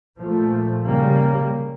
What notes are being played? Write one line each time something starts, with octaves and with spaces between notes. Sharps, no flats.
A#2 F3 A3
C#3 G3 A#3